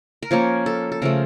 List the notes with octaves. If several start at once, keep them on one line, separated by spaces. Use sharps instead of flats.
A#4
F3 A#3 C#4 C#5
A4
A4
C#3 F3 A3 A#4